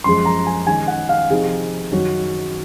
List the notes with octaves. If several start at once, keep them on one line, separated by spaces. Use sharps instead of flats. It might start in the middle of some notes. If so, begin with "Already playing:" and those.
F#2 F3 G#3 C6
A#5
G#5
D#3 G#3 C#4 G#5
F#5
F5
C3 F3 C4 D#4 G#4
F#2 D#3 F#3 C#4 F#4